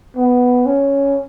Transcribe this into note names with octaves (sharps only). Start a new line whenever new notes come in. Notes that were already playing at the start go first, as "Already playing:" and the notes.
B3
C#4